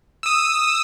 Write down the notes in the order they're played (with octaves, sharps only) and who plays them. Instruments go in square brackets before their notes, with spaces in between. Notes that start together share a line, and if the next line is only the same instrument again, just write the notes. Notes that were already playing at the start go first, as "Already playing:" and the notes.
[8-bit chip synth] D#6 E6